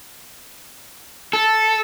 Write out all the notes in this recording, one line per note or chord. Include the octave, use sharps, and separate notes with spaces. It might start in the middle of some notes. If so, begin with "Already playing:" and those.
A4